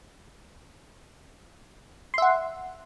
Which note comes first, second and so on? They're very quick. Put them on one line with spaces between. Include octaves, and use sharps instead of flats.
C6 E5 F#5